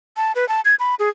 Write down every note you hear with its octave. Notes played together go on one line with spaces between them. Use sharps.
A5
B4
A5
G#6
B5
G#4